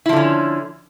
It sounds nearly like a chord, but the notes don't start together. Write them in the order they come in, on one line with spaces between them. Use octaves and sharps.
E4 F3 D3 C#4